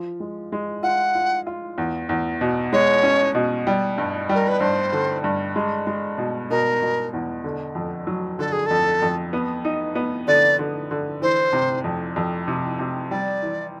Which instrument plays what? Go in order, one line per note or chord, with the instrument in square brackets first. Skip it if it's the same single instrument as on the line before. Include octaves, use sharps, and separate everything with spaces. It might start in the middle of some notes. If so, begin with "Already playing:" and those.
Already playing: [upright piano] F3
G#3
G#3
[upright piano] F4 [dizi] F#5
[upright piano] F4
F4
E2
E2
B2
[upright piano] G#3 [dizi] C#5
[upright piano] C#4
B2
G3
G2
[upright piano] G3 [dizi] A#4
[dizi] B4
[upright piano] G2 [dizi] C5
[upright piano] D3
G2
G#3
G#3
B2
[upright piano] B2 [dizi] A#4
[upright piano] B2
E2
D3
F2
F#3
[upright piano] D3 [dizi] A4
[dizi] G#4
[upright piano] F2 [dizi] A4
[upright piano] F2
B3
D#4
B3
[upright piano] D3 [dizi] D5
[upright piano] D3
D3
[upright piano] E3 [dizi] C5
[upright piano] C3
F2
F2
C3
C3
[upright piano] G3 [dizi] D5
[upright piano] E3